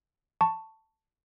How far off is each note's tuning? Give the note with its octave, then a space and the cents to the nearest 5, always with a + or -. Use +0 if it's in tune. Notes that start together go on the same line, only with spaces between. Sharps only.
A5 +10 C#6 +0